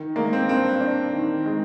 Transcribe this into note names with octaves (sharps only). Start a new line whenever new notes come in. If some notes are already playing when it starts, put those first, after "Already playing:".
Already playing: D#3
G#3 A#3
C4
G2 C4
D4
D#3
G#3